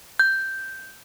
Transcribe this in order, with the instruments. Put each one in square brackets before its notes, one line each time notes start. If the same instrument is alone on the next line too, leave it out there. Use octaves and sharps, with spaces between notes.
[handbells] G6